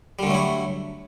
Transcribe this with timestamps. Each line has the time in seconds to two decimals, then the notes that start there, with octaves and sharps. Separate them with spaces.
0.19 G3
0.23 D3
0.27 A3
0.30 F#3
0.34 E4